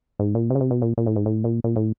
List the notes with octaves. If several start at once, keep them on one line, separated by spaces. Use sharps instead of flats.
G#2
A#2
C3
C#3
C3
B2
A#2
A#2
A2
G#2
A2
A#2
A#2
A2